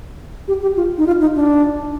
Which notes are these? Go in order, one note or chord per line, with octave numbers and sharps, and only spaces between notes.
G4
G4
F4
D#4
F4
D#4
D4